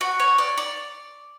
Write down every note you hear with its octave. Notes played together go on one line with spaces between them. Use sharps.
F#4
C#5
D5
D5